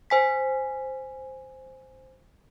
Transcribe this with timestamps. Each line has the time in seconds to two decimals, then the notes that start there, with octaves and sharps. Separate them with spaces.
0.10 C5 G#5 B6